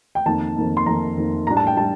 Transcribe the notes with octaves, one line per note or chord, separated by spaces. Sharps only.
G5
F2 D#3 A#3 A5
F2 D#3 A#3
C6
F2 D#3 A#3 A#5
F2 D#3 A#3
A2 G3 D4 A#5
A5
G5
G3 D4 A5